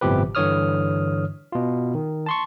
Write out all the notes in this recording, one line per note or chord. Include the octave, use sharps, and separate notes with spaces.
G1 A2 C3 F3 G4 B4
G2 D3 E3 C#5 D#6 F6
B2 F4
D#3
A5 C6 C#6